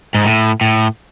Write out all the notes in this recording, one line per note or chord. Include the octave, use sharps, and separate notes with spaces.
G#2
A2
A2